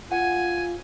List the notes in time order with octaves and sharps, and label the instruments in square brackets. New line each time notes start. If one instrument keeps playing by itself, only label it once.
[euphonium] F4 [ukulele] F#5 [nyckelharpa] G#5